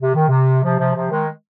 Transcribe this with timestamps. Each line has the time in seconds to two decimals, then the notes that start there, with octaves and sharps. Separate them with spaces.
0.01 C3
0.15 D#3
0.28 C3
0.63 C3 F3
0.79 C3 F3
0.94 C3 F3
1.11 D#3 G#3